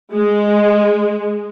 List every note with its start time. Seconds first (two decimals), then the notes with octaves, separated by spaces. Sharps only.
0.14 G#3